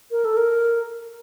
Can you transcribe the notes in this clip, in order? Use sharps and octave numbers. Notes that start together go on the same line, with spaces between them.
A#4
A4
A#4